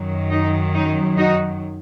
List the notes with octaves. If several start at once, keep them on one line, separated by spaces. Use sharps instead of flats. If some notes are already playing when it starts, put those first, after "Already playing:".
Already playing: F#2 D#3 F#3
D#4
D#4
D#4 F#4